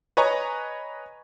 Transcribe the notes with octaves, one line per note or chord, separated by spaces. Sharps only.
B4 C#5 D#5 G#5 A#5 C#6